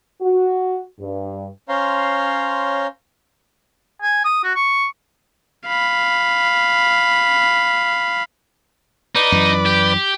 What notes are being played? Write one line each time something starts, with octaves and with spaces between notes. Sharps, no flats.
F#4
G2
C#4 C5 C#5 F5 A#5 C6
G#5
D#6
F#4
C#6
F5 B5
D#4 B4 D5
F#2 E3
G4